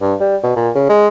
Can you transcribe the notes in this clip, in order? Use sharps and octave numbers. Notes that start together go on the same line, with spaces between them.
G2
G3
B2
A#2
C#3
G#3